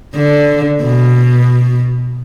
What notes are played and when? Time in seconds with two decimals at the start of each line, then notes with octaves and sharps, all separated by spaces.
0.15 D3
0.82 B2